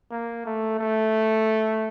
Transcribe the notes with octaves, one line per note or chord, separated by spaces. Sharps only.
A#3
A3
A3